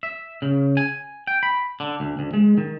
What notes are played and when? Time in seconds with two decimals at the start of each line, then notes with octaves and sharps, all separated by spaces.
0.03 E5
0.42 C#3
0.77 G#5
1.27 G5
1.43 B5
1.80 D3
2.00 D2
2.19 D2
2.33 G#3
2.58 D#3